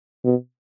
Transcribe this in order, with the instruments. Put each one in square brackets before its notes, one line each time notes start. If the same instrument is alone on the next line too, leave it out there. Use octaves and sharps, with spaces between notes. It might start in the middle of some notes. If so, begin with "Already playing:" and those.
[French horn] B2